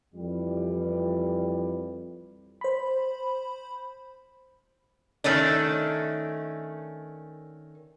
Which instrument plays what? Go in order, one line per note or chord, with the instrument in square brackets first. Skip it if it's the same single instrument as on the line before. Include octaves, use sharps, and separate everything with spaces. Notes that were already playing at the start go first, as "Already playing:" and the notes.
[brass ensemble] F2 E3 G3
[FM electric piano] C5 B5
[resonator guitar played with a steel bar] D#3 A3 C#4 D4